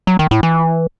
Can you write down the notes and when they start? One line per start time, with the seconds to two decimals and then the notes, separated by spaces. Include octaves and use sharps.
0.07 F#3
0.19 D#3
0.31 A2
0.43 E3